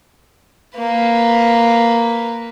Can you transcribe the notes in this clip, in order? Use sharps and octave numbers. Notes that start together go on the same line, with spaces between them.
A#3 B4